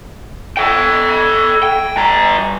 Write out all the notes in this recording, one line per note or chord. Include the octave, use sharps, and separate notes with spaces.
A4 G5
G5
G2 A#5